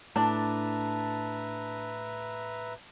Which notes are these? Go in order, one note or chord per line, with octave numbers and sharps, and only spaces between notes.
A2 D4 B4 E5 A5 A#5